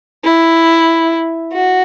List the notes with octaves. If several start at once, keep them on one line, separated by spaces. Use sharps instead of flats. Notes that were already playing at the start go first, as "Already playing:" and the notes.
E4
F#4